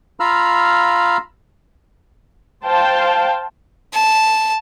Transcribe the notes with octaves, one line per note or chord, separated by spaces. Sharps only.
F4 F5 A#5 B5 E6 F6
C5 F5 G5 A5
A5